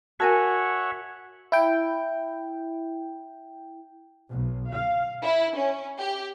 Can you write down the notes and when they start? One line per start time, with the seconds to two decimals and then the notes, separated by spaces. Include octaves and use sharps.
0.20 F#4 A#4 C#5 E5 F#5 G#5 A5
1.52 E4 G5
4.30 B1
4.71 F5
5.22 E4
5.55 C#4
5.98 G4